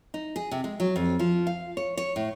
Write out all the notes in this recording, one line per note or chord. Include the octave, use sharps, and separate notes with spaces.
D#4
G#4
C3
G#3
F#3
F2
F3
F5
C#5
C#5
A2